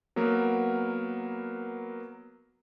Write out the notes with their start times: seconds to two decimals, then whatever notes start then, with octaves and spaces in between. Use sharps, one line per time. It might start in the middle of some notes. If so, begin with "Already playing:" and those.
0.16 F#3 A#3 B3 A#4 B4